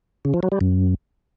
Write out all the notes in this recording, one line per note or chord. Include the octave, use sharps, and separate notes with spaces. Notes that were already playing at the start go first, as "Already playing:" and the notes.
C#3
F3
F#3
G3
F#2